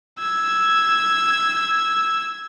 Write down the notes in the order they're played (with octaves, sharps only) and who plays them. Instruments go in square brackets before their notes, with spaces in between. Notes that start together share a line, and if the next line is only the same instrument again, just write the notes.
[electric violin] E6 G#6